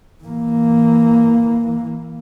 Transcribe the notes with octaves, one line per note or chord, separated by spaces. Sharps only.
E3 A#3